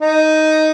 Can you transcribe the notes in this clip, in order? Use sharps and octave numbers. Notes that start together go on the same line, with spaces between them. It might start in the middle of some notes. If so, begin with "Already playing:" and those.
D#4